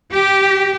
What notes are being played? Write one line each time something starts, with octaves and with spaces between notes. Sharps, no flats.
G4